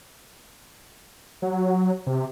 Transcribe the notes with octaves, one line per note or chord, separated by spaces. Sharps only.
F#3
C3